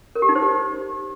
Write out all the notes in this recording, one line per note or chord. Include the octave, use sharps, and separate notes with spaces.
A#4
G4
D#4
C5
G4